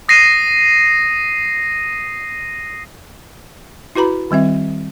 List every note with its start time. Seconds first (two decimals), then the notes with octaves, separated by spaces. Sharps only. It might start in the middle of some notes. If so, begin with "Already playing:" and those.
0.09 D#6 A#6 C7 D#7
3.95 E4 F#4 B4 A#5 B5
4.31 D#3 G3 C4 E5